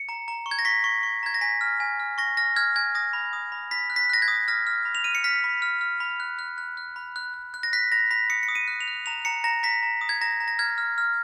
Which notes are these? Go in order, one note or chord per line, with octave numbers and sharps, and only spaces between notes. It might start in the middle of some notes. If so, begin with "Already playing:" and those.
Already playing: C#7
A#5
A#5
C#6
G#6
A#6
C#6 B6
C#6
C#6
A#5 G#6
A#6
G#5 B6
F6
G#5
F6
C#6 A#6
F6 A#6
F6 G#6
G#5 G#6
D#6 A#6
B5
D#6
B5
B5 B6
F#6
B6
F#6 A#6
G#6
D#6
F6 A#6
F6
B5
F7
F6 D#7
C#7
F6 B6
B5
F6
F6
B5
F#6
F#6
F#6
F#6
B5
F#6
F#6
F#6
A#6
F#6 B6
B5 A#6
B5 B6
D#6 C#7
C#7
D#6
D#7
F#6
F7
F#6
A#5 F7
A#5 C#7
A#5 A#6
A#5 B6
A#5
D#6
G#6
A#5 A#6
A#5
A#6
F6 G#6
F6
F6